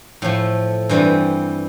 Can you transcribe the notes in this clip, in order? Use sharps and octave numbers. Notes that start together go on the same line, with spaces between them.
A2 F3 A3
G2 E3 G3 C4